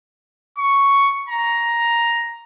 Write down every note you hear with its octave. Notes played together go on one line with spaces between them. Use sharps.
C#6
A#5